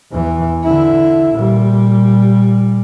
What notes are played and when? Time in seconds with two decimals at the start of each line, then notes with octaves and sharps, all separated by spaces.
0.12 E2 E3
0.64 D3 E4
1.35 A#2 G3